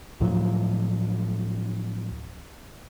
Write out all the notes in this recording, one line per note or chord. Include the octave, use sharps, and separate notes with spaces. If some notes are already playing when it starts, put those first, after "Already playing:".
D2 A2 F3 F#3